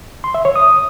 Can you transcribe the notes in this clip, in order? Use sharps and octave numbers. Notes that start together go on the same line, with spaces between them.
C6
E5
C#5
D#6